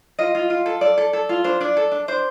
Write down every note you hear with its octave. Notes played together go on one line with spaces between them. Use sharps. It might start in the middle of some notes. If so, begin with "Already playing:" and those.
F4 D#5
F4
F4
A4
A4 D5
A4
A4
F4
D4 C5
D4 D5
A4
D4
D4 C5